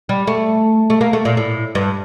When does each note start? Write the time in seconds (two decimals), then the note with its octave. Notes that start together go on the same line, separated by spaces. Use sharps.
0.09 G3
0.27 A3
0.90 A3
1.01 A#3
1.13 A3
1.25 A#2
1.37 A2
1.75 G2